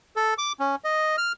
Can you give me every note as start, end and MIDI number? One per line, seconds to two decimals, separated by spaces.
0.16 0.34 69
0.38 0.53 86
0.60 0.76 61
0.84 1.16 75
1.18 1.32 89